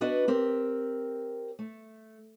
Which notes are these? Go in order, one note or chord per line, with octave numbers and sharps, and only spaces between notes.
B3 D4 F#4 B4 D#5
C4 G4 A#4
A3